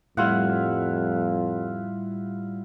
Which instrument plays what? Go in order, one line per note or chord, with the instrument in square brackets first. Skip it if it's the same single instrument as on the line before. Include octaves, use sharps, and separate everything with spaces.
[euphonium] F2 [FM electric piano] A2 G3 [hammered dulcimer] E4 F4 F#5